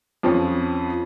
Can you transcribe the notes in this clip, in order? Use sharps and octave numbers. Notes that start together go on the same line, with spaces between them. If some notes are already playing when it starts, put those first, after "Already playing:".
F2 F3 C4 C#4